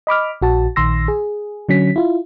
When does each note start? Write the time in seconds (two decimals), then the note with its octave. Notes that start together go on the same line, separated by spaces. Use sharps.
0.07 D#5 B5 D6 F6
0.42 A#1 F#4 A5
0.76 A#1 D#3 C6 E6 A#6
1.08 G#4
1.69 D3 F#3 C#4 B6
1.96 E4 F4